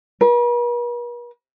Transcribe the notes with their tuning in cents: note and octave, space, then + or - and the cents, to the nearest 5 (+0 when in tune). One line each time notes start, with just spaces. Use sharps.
B4 -45